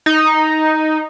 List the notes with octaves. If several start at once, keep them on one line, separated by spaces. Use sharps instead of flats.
D#4